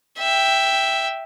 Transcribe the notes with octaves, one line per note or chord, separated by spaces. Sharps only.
E5 G5